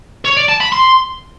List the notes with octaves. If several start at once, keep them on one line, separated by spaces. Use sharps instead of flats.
C#5
D5
A5
B5
C6